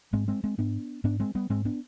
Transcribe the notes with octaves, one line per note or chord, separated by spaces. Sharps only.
G#2 G#3 C4
G#3 C4
G#3 C4
G#2 B3 D4
G#2 B3 D4
G#3 C4
G3 B3
G#2 G#3 C4
B3 D4